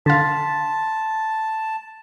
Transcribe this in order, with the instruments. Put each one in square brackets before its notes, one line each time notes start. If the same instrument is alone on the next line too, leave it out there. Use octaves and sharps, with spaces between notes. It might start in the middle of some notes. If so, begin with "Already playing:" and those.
[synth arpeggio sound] D3 F5 [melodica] A5 [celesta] C6 A6 B6